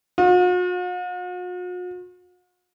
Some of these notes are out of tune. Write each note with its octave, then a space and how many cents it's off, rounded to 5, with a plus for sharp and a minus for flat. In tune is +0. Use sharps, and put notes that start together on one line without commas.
F#4 -45